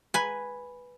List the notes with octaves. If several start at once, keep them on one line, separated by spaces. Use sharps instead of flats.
B4 G#5